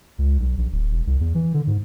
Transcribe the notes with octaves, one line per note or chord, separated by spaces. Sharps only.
C#2
B1
A#1
D1
E1
C2
E2
E3
D3
G#2